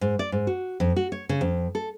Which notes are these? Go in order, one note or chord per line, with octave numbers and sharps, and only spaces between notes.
G#2
D5
G#2
F#4
F2
F#4
C#5
C#3
F2
A4